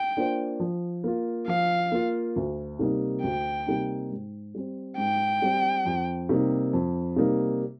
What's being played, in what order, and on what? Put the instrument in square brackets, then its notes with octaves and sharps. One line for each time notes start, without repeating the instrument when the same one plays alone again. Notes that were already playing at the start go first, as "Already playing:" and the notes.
Already playing: [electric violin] G5
[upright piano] A#3 D4 F4 C5
F3
A#3 F4
[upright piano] F3 [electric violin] F5
[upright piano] A#3 F4
D2
C3 G3 A#3 D#4
[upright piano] D2 [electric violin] G5
[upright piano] C3 G3 A#3 D#4
G#2
G3 C4
[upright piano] G#2 [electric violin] G5
[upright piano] G3 C4
F2
C3 G3 A#3 D#4
F2
C3 G3 A#3 D#4